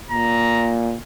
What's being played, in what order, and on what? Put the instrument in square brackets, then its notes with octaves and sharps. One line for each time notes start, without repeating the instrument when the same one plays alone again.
[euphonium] A#2 [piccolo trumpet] A#5